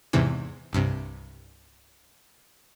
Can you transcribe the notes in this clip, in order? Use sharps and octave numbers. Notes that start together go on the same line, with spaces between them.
E2 G#2 C3 E3
C2 G2 C3